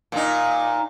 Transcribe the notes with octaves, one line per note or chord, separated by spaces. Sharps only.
A#2 D#4